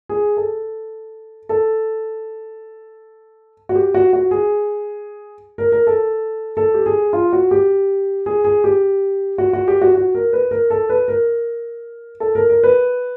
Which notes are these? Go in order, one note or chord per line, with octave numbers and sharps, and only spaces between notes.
G#4
A4
A4
F#4
G4
F#4
F#4
G#4
A#4
A#4
A4
A4
G4
G#4
F4
F#4
G4
G#4
G#4
G4
F#4
F#4
G4
F#4
F#4
A#4
B4
A#4
A4
B4
A#4
A4
A#4
A#4
B4